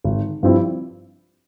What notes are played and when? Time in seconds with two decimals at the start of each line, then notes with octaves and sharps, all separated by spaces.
0.04 G#1
0.43 G2 F3 C4 E4